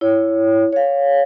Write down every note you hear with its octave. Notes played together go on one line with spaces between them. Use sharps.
E4 C#5
C#5 F5